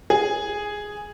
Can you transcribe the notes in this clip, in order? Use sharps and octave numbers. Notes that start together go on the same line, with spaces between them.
G#4